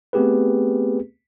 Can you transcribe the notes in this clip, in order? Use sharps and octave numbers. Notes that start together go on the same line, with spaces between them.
A3 B3 C4 G4 G#4 B4